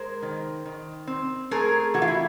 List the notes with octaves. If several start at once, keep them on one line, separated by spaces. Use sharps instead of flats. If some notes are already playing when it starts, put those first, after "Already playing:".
Already playing: G#3 A#4 C5
D#3
D#3
C4
A3 G#4 A#4
E3 F#4
F4
E4